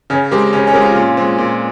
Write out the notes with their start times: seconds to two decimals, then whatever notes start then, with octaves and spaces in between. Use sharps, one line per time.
0.10 C#3 C#4
0.31 G#3 C4 G4 A#4
0.53 C#3 C#4
0.67 C#4
0.74 G#3 C4 G4 A#4
0.82 F4
0.96 A#2
1.17 G#3 C4
1.38 A#2